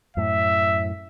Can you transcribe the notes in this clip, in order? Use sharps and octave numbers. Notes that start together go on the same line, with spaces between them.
F#2 A2 E5